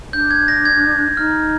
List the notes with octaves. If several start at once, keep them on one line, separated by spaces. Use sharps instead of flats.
D4 G6
G#6
A#6
G#6
D#4 F6